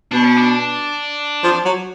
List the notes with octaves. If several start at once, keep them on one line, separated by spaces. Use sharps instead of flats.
B2 D4
C#4
D4
F3
F#3